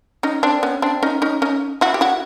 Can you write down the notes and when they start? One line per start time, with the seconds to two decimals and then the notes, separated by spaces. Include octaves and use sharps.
0.23 C#4 D#4
0.43 C4 D4
0.63 B3 C#4
0.82 C4 D4
1.03 C#4 D#4
1.22 C#4 D#4
1.42 C#4 D#4
1.81 E4 F#4
1.94 G4
2.01 E4 F#4